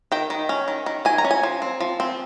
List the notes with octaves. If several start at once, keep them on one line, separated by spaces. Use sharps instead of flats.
D#3 G5
D#3
C#4
D#3
D#3
D#3 G#5
A#5
C#4
G#5
F3
C4
F3
C4